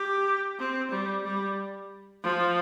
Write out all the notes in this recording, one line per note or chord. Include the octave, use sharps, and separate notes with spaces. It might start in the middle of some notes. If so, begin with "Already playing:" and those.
Already playing: G4
C4
G3
G3
F3